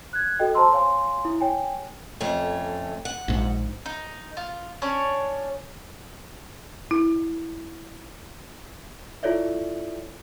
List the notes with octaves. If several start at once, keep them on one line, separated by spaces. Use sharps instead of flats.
F#6 G#6
F#4 A4 D#5 G5
C5 A5 A#5 C6 E6
C#5 F5 G#5 C6
E4
C#5 G5 G#5
F2 A3 C#4
F#5
A#1 G#2
D#4
F4
C#4 D4 C#5
E4
E4 F4 A4 C#5 D5 E5